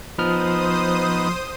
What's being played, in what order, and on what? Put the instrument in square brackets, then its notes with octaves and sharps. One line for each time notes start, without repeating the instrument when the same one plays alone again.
[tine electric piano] F3 F6 [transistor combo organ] B3 D#4 [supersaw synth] C5 D#6